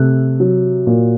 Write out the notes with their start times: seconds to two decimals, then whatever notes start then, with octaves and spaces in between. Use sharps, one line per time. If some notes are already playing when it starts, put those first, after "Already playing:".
Already playing: C3 A3 F#6
0.40 F#3
0.87 A#2